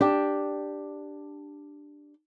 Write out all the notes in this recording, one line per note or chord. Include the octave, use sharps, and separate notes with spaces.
D4 G4